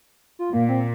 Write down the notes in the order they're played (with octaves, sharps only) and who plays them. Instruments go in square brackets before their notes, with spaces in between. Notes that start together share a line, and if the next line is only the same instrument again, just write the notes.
[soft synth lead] F4
[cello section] A#2 [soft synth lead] A#3
[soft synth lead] C4